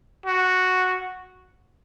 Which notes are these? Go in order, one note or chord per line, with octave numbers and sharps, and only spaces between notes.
F#4